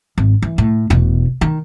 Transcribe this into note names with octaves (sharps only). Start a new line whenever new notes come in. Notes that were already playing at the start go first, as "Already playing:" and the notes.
G#1
E3
A2
E1 B2
D#3